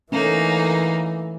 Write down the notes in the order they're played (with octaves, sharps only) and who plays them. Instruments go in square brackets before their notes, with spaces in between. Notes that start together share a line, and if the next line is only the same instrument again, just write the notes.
[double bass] E3 [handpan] A3 C#4 [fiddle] A#3 D#4